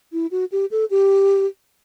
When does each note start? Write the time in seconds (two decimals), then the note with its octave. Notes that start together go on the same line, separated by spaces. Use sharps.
0.13 E4
0.31 F#4
0.52 G4
0.71 A4
0.91 G4